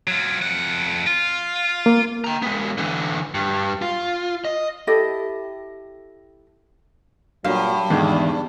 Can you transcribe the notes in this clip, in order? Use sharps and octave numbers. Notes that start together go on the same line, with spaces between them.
F#3 F4
F2 F#5
F4
A#3
G5 A#5
G#3 B3
D3 E3
G2
F4
D#5
E4 G4 A4 D#5
G2 A#2 F#3 F5
E2 G#2 D3 D#3 D4